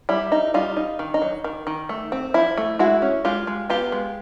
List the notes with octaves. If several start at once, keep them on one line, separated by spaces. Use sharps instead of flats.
G3 E4
D#4
G3 D#4 F4
D#4
D#3
D#4
F#3
D#3
D#3
A3
C4
F3 E4
A3
G#3 E4 F#4
C#4
G#3 F4 G4
G#3
B3 F4 G4
G#3